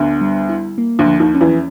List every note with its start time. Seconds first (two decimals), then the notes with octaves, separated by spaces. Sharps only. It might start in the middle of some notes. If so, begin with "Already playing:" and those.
Already playing: D2 D3 B3
0.21 G3
0.49 E4
0.78 A#3
0.99 D2 D3
1.06 F3
1.20 D#2 D#3
1.34 C#4
1.41 E2 E3